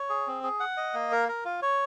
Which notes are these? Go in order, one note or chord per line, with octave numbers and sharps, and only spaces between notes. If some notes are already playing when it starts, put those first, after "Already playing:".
Already playing: C#5
G#4
C4
G#4
F#5
D#5
A#3
A#4
A#4
F4
C#5